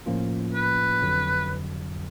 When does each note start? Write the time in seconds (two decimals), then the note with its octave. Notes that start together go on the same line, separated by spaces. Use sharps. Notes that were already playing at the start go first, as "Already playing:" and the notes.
0.06 A2 F3 A#3 C#4 F4
0.54 B4
1.02 F2 D3 F#3